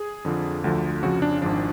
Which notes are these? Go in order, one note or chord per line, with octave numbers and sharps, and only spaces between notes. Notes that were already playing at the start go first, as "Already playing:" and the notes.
Already playing: G#4
F2 D3 F3
D2 D3 F3
F2 C#3 F3 F#4
D4
G#1 G#2 F3 D4